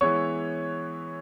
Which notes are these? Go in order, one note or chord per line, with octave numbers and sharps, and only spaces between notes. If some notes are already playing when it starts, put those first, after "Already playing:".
E3 G#3 B3 E4 C#5 C#6